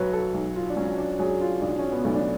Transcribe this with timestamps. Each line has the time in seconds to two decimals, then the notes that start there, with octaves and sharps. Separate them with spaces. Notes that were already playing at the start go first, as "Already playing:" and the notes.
Already playing: B1 F#3 B4 C#5
0.13 A4
0.34 B1
0.56 F4
0.70 D4
0.76 F#3 C#4
0.98 D4
1.19 F#3 G#4
1.41 F4
1.61 B1 D4
1.79 C#4
1.92 B3
2.04 B1 A3
2.15 D4